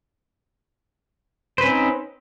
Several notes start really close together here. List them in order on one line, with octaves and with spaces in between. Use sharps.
C5 B4 C#4 C4 D#4